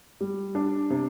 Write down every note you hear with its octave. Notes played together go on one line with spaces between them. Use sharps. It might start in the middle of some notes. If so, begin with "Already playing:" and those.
G3
D4
C3